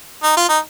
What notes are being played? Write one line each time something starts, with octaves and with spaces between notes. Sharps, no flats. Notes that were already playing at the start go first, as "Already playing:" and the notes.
D#4
F4
D#4